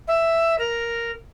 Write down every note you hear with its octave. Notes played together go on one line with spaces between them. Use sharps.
E5
A#4